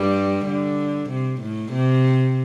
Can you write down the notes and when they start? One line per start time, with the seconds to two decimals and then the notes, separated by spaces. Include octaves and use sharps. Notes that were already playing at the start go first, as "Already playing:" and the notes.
Already playing: G2 G3
0.46 D3
1.09 C3
1.41 A2
1.72 C3